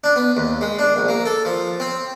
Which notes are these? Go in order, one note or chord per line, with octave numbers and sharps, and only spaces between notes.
D4
B3
D#2
G#3
D4
A#1
A#3
A4
F3
C4